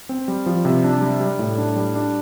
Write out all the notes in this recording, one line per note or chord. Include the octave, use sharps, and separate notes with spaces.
C4
G3
F3
C3
D4
G3
G3
A2
D4
G3
D4